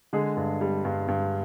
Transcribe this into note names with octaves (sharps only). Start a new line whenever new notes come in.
D3 G#3 G#4
G2
G3
G2
G2